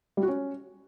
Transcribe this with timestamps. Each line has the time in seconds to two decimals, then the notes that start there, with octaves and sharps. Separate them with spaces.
0.17 G3
0.23 F#4
0.28 C#4